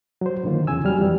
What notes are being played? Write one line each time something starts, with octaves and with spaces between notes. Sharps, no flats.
F#3 C5
A#2 D3 D#3 A#3 F4
E2 C#3 G#5 E6
F2 F#3 G3 F6
F2 E3 G3